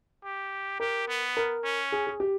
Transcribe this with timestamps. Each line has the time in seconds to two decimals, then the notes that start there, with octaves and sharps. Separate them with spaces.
0.24 G4
0.80 G4 A#4
1.08 B3
1.37 A#4
1.64 C#4
1.92 G#4
2.07 G#4
2.20 G4